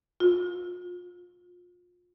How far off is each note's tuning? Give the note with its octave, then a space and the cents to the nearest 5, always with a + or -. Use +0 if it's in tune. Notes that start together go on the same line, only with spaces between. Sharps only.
F4 +25